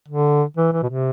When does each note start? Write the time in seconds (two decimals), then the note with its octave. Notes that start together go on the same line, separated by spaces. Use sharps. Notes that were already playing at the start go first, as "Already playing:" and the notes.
0.08 D3
0.57 E3
0.73 E3
0.83 B2
0.89 C3